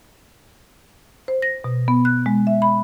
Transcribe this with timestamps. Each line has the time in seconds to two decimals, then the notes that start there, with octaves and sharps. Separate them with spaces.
1.28 C5
1.42 A#6
1.64 B2
1.88 B3
2.05 F#6
2.26 G#3
2.47 E5
2.62 B5